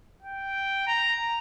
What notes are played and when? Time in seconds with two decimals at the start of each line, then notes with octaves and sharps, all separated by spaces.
0.22 G5
0.87 A#5